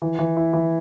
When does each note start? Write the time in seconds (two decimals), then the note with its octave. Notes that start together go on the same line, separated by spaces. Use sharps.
0.02 E3
0.19 E3
0.37 E4
0.53 E3